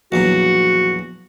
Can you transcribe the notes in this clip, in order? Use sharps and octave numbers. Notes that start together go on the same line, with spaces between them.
A#1 E2 F#3 F#4